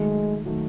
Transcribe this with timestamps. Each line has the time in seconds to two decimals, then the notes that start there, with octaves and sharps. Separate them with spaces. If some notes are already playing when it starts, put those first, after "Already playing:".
Already playing: D#3 F#3 G#3 A3
0.46 D#3 F#3 A3